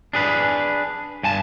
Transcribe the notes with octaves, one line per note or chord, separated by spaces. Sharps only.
D4 G#4 B4
G2 G#5 A5